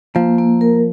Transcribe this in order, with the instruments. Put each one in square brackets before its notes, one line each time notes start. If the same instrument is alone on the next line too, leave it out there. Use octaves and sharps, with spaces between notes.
[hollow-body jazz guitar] F3 [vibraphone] A#3
[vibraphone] A#3
A#4